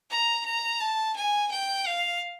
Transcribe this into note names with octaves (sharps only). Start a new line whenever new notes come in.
A#5
A#5
A5
G#5
G5
F5